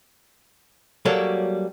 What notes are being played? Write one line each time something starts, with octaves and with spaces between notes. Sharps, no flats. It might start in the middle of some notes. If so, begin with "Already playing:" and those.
F#3 G3 A#3 F#4 A4 C#5